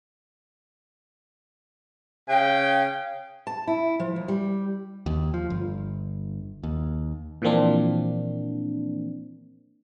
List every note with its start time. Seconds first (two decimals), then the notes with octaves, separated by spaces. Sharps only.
2.29 C#3 G5
3.47 A5
3.67 E4
4.00 F3
4.16 D#2
4.28 G3
5.06 D#2
5.34 F3
5.50 G1
6.63 D#2
7.42 A#2 E3 F3 A#3 C4 D4